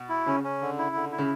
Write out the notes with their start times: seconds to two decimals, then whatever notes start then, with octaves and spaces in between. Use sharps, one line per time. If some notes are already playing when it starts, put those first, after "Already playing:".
Already playing: B2
0.09 E4
0.26 C#3 C#4
0.43 C#4
0.61 D3
0.78 E4
0.95 D3
1.12 E4
1.18 C#3